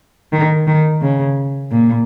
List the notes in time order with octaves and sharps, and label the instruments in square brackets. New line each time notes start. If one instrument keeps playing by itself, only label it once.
[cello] D#3
D#3
C#3
A#2